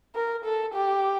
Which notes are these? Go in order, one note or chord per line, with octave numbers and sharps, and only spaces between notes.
A#4
A4
G4